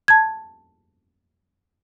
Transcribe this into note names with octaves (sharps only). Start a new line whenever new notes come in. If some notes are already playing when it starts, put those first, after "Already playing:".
A5 G#6